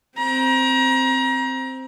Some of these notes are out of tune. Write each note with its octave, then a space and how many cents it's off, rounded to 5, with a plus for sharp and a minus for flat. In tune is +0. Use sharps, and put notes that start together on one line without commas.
C4 +0 A#5 +30